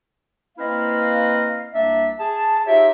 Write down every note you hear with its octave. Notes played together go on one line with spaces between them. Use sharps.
A#3 C4 E4 B4 D#5 F5
C2 A#3 D4 D5 E5
G#4 A5
D#4 F4 G4 C#5 E5